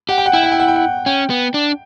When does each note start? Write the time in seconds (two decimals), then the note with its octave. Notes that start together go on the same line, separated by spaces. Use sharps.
0.09 G4 F#5
0.18 G5
0.26 F#5
0.33 E4 G5
0.43 F#5
0.52 G5
0.60 F#5
0.68 G5
0.76 F#5
1.06 C#4 G5
1.30 B3
1.54 D4